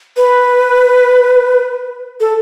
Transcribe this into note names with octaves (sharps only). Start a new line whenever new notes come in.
B4
A4